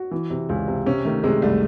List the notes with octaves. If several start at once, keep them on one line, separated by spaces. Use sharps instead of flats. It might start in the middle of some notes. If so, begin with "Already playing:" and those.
Already playing: F#4
E3
C3
C#2
C3
C3 C#4
D#3 A3
C3 G#3
C2 A3